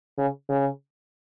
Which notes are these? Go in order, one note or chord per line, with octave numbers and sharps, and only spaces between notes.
C#3
C#3